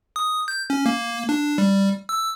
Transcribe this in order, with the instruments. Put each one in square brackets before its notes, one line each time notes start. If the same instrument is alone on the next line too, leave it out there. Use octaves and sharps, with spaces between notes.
[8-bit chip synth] D#6
G6
C#4
A#3
D4
G3
E6